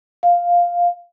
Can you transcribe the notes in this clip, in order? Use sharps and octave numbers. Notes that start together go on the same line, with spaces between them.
F5